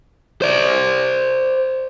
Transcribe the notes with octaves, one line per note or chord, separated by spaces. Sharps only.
C5 D5